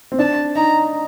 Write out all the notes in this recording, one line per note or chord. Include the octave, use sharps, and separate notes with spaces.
C4
D4 A5
D#4 A#5